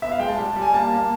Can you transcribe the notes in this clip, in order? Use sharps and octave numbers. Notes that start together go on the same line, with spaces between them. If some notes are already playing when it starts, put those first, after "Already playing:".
B3 E5
F5
G#3 G5
A5
G3
G3
G#5
A#3 A5
A#3